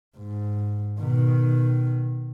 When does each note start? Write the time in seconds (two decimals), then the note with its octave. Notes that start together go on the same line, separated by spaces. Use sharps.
0.17 G#2
1.00 B2 D#3